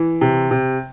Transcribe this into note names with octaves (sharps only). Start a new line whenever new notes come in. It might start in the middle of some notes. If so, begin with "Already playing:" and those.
Already playing: E3
C3
C3